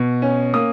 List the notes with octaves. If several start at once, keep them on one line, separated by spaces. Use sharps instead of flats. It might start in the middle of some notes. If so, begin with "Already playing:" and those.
Already playing: B2
C#4
A#3 D#6